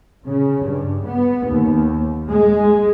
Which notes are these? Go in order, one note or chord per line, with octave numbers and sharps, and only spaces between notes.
C#3
G2
B3
D#2
G#3